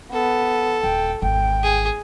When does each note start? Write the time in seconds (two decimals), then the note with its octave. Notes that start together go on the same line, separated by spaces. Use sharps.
0.12 B3 A4
0.83 D#1 G5
1.22 G#1 E2 G5
1.63 G#4